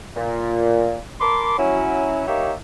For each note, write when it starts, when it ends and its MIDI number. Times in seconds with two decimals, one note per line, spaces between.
0.16 0.98 46
1.21 1.55 70
1.21 1.55 81
1.21 1.55 83
1.21 1.55 84
1.21 1.55 86
1.58 2.25 54
1.58 2.25 61
1.58 2.25 64
2.28 2.53 58
2.28 2.53 63
2.28 2.53 67
2.28 2.53 73
2.28 2.53 76